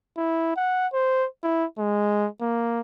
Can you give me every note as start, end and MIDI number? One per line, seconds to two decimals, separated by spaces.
0.17 0.56 64
0.56 0.87 78
0.93 1.26 72
1.43 1.65 64
1.79 2.28 56
2.41 2.80 58